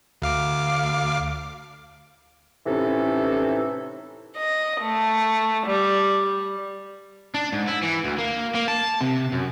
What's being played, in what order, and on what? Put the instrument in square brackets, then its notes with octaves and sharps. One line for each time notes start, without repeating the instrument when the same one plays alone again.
[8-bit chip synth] D2 F5 D6
[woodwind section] A2 C3 E3 C#4 D#4 A4
[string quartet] D#5
A3
G3
[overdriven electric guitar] D4
G#2
E4
E3
D2
A#3
A#3
A5
C3
F#2